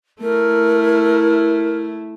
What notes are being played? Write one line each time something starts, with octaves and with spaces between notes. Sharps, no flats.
A3 E4 A#4